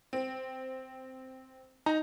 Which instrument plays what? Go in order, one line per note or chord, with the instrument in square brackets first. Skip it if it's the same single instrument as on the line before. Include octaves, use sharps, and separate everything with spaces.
[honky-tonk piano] C4
[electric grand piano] D#4 [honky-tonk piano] A#5